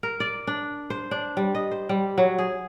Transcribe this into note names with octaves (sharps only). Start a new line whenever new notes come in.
A#4
D5
D4
C5
D4
G3
D#5
C5
G3
F#3
G#4